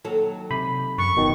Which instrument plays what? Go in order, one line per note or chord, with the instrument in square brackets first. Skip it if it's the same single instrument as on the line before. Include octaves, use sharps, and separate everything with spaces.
[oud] D#2 F#3 A4
[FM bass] C3 [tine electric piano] B5
[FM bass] F#2 [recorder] C#6
[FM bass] D#1 [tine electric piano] B2 D#3